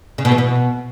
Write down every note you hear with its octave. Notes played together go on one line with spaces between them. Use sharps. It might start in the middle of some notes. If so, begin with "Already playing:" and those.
C#3
B2
E3
B2